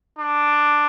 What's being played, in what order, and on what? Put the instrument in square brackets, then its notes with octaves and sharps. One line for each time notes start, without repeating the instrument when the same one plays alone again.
[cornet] D4